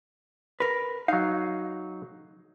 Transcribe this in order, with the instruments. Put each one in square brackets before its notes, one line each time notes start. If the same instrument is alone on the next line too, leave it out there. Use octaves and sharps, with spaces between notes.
[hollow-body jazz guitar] A#4 B4
[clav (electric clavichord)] F#3 D#4 [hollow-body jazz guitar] F5